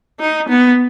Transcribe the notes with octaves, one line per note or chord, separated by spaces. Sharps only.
D#4
B3